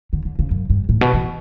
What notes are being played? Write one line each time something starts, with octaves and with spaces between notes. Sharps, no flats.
D3
D3
C#3
F#2
G2
A2
B2
E3